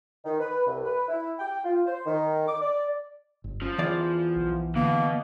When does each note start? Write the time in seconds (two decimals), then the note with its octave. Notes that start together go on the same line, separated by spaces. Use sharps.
0.25 D#3
0.40 B4
0.66 C2
0.84 B4
1.08 E4
1.39 G5
1.64 F4
1.86 C5
2.05 D#3
2.47 D6
2.61 D5
3.44 G1
3.62 F3 C#4
3.78 E2 D5
4.36 B1
4.75 B2 D3 A#3